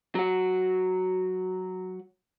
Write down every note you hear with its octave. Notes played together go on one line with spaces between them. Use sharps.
F#3 F#4